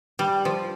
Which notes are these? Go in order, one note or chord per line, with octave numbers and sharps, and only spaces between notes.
G3
F3